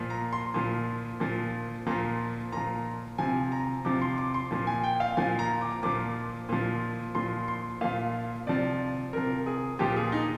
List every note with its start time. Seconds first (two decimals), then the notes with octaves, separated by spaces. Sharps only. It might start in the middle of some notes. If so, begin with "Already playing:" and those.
Already playing: A#2 F3
0.10 A#5
0.33 C6
0.54 A#2 F3
1.20 A#2 F3
1.86 A#2 F3 A#5
2.52 A#2 F3 A#5
3.18 C3 F3 G#5
3.52 A#5
3.85 C3 F3 D6
4.02 C6
4.18 D6
4.34 C6
4.51 A#2 F3
4.67 G#5
4.83 G5
5.00 F5
5.17 A#2 F3 G#5
5.39 A#5
5.61 D6
5.83 A#2 F3 D6
6.49 A#2 F3
7.15 A#2 F3 C6
7.48 C6
7.81 A#2 F3 F5
8.47 C3 F3 D5
9.13 C3 F3 A#4
9.46 G#4
9.79 A#2 F3 G4
9.96 G#4
10.12 D#4